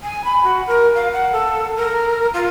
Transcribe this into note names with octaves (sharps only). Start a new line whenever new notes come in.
G#5
B5
F#4
A#4
F5
F#5
A4
A#4
F4